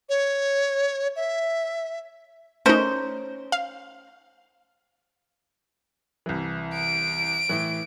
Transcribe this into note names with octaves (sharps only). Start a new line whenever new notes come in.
C#5
E5
A3 C#4 D#4 A#4 C5
F5
C2 E3
D7
A2 E3